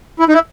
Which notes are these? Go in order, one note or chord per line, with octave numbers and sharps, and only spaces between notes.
E4
D#4
E4